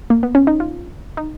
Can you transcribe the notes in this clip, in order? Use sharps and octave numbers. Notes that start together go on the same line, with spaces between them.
A#3
B3
C#4
D#4
F4
D#4